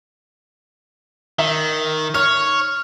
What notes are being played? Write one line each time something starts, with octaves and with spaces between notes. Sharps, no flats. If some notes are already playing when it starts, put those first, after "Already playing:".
D#3 E5
C#5 F6